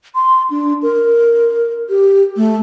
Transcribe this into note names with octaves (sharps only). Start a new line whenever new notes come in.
C6
D4
A#4
G4
A3